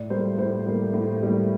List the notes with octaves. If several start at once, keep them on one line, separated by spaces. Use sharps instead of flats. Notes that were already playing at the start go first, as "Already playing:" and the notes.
Already playing: A2 D5
G3 A#3 C5
A2 C5
G3 A#3
A2
G3 A#3